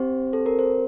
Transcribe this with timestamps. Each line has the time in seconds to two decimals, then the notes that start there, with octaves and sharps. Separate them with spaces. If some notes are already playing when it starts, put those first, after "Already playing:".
Already playing: C4 G4 C5
0.33 A4
0.46 A#4
0.59 C5